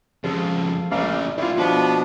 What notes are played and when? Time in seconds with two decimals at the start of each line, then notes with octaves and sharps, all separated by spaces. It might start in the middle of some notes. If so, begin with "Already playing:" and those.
0.24 F2 C#3 F3 G#3 F4 A4
0.91 A#1 C#3 A3 D5 F5
1.38 D#3 E4 F4 A5
1.58 B2 F3 B3 D4 F#4 G4 B4